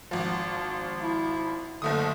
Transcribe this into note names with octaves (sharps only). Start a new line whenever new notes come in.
G#1 F3
E4
F#1 D3 A3 D#6